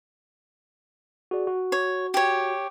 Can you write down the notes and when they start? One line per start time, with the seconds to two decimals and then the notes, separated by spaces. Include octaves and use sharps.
1.31 F#4 G#4 D5
1.47 F#4
1.72 C#5
2.14 G4 C#5